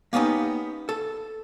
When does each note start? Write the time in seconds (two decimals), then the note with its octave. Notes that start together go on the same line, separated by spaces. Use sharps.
0.13 A#3 B3 C#4 D#4 G4
0.89 A4